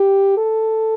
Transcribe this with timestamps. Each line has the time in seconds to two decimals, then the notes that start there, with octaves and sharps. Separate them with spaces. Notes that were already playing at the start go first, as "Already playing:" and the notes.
Already playing: G4
0.37 A4